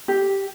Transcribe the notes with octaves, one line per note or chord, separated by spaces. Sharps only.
G4